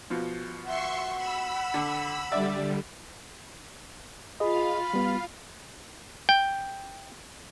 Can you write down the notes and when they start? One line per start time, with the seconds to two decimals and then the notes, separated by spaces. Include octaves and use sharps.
0.10 B2 F3
0.65 E5 F#5 C6 C#6
1.17 B5 E6
1.74 D3
2.32 D3 G3 D5 E5
4.40 F4 G#4 D#5 F5 B5
4.94 G3 B3
6.29 G5